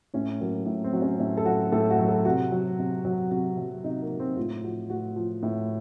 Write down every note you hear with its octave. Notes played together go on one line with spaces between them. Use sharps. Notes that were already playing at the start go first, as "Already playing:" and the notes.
A2 C#4
F#3 A#3
A2
C4
F#3
C#4
A2 C#4
A4
F#3 F#4
A2 A4
F#4
F#3
A4
C3 F#4
F#3
C3
F#3
C3 F#4
F#3
C3 D#4
A#3
F#3
C4
A2 F4
F3 F#4
A2 F#4
F3
A2